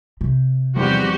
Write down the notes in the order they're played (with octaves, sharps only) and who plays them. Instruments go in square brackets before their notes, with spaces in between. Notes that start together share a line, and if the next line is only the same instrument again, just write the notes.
[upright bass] C3
[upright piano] G#1 E2 G3 [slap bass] F3 [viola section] F#4 G4